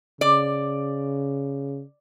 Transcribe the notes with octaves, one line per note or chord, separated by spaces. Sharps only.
C#3 D5